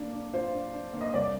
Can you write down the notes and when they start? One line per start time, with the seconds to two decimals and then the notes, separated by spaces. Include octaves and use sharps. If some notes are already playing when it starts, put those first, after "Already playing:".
Already playing: A#3 D4
0.13 D4
0.33 F4 C5
0.53 D4
0.73 D4
0.93 A#3
1.01 D#5
1.14 C2 D5